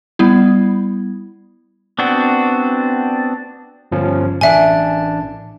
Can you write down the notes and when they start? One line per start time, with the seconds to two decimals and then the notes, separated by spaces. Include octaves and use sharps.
0.19 G3 B3 E4
1.99 B3 C4 D4 F#4
3.92 G1 F3 C#4
4.41 A1 D4 E5 G#5